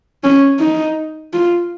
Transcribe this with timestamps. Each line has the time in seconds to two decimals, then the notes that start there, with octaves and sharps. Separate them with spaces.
0.24 C#4
0.59 D#4
1.33 F4